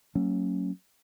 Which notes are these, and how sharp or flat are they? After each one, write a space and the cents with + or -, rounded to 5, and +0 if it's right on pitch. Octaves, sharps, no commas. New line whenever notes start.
F#3 +10 A#3 -40 C#4 +0